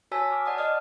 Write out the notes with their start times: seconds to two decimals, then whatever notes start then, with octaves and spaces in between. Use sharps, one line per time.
0.11 F#4 C#5 G#5 A5 E6 B6
0.31 D6 F6
0.46 D5 F#5 A5 D#6
0.58 D5 D#5 F#5 D#6 F6